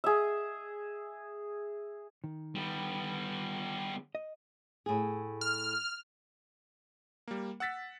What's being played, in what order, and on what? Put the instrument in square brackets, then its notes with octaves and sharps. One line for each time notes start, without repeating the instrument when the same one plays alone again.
[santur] G#4 E5
[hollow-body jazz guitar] D#3
[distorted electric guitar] G3 B3
[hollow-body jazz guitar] D#5
[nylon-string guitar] A2 G#4
[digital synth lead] F6
[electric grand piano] G3 A#3
F#5 E6 A6 B6